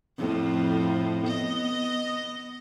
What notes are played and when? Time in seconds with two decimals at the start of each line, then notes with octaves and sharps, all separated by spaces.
0.18 F2 A2 F3
1.24 B3 D#5